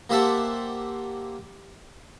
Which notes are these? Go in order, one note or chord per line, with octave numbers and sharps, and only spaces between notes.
A#3 G4 C5 E5 F#5 A5